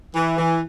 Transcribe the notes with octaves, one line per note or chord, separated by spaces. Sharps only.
E3
E3